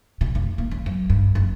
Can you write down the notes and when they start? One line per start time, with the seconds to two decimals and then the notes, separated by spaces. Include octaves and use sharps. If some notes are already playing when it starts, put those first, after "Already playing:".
0.21 B2
0.35 F1
0.58 A#3
0.71 C#3
0.86 F#2
1.10 G2
1.35 F#1